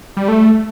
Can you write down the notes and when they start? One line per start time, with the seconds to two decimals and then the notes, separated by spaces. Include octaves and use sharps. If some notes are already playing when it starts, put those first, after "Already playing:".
0.17 G3
0.28 A3